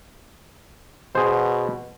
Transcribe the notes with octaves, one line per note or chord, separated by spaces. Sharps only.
B2 G#4 C5